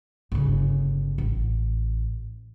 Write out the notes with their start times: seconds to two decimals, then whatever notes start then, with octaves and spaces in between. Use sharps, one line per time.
0.32 G1 C#3
1.18 A1